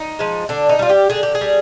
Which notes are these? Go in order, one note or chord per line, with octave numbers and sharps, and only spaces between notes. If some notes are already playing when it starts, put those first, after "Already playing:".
Already playing: D#4
F3 G#3
D3 D4
D#4
G3 F4
G4
D3 G#4
G4
G#4
G3